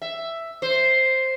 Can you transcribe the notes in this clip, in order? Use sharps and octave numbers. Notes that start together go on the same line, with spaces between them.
E5
C5